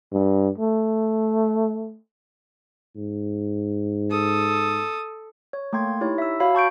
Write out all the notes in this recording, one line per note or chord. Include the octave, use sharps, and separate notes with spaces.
G2
A3
G#2
A4 D#6
C#5
A3 A#3 G5 C6 G#6
D#4 E4 G4 C#5
E5 E6
F#4 C#5 F5 B5
A5 C#6 G6 D7